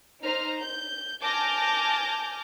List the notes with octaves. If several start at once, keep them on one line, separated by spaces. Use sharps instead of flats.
D#4 C5 A#5 F6
G6
G#5 A5 D6 F6 G6 A#6